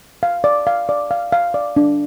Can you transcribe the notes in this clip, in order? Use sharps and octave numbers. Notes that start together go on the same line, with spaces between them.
F5
D5
F5
D5
F5
F5
D5
D4